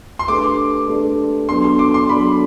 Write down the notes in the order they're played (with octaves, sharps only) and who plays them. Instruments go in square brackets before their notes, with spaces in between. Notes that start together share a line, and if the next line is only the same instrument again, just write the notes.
[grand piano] C6
[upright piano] A3 D4 G4 B4 [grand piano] D6
[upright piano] A3 D4 G4 B4
[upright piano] F#3 B3 D4 A4 [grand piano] C6
[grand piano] C6
D6
C6
[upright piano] F#3 B3 D4 A4 [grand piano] B5